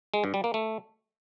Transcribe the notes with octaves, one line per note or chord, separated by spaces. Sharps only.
G#3
G2
G3
A#3
A3